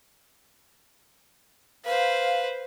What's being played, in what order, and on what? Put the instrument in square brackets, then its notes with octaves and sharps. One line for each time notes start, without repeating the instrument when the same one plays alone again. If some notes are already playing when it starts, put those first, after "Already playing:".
[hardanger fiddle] B4 C5 [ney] F5